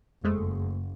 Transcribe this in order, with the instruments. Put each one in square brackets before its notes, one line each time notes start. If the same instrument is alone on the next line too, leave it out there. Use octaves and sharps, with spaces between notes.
[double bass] F#1 [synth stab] F2 G#3 A3